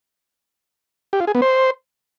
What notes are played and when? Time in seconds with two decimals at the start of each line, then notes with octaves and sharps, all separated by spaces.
1.13 G4
1.20 F4
1.27 G#4
1.35 B3
1.42 C5